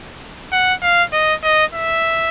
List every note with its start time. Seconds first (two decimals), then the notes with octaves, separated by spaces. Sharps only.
0.52 F#5
0.82 F5
1.13 D#5
1.43 D#5
1.75 E5